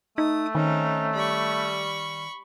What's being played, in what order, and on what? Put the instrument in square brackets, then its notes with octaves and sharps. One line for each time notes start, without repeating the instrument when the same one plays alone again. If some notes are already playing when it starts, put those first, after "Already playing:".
[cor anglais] A3 [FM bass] D#4 [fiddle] D#6
[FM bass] D#3 [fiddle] C4 D#4 [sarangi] C#4
[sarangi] G3 [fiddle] B5 C#6